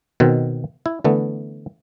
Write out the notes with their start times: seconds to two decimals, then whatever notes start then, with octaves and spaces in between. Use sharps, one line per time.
0.20 B2 D#3 C4
0.86 E4
1.04 D3 E3 A3 B3